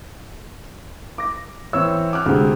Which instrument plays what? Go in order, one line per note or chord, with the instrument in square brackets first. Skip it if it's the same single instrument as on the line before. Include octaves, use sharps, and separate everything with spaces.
[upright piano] D6 A#6
[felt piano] E3 C4 [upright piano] C#5 E6
[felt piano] D6 F6 F#6
[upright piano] D2 C3 [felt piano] G#3 C4